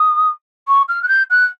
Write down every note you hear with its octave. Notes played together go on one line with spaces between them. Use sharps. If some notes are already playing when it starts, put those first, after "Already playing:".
Already playing: D#6
C#6
F6
F#6
G6
F#6